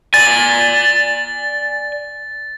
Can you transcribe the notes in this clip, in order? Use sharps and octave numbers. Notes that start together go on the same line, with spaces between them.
D5 G#5 A6